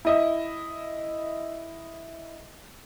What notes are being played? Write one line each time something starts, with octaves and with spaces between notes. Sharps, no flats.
E4 D#5 E5